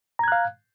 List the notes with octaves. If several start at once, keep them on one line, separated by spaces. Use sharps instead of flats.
F5 A#5 F#6 G#6